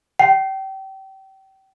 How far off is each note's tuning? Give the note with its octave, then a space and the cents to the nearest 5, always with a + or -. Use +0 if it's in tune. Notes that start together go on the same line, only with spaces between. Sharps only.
G5 -30